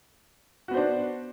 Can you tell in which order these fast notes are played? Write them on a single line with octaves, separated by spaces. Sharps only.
F#4 B3 C5 D4